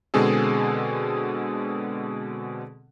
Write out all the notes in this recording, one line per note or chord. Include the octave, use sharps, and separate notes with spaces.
B2 D3 G#3 C4 G#4 A4